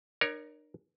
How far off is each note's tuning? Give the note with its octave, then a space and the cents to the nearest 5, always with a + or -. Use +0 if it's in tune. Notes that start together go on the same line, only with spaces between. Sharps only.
D4 +45 A#4 +15 C#5 +0